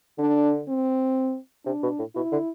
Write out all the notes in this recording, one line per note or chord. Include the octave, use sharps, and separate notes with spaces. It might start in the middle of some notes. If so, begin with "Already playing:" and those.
D3 D4
C4
C3 D4
B2
A2
B2 E4
D3